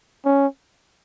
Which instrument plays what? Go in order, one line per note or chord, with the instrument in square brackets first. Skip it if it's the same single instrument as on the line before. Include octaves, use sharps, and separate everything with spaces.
[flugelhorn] C#4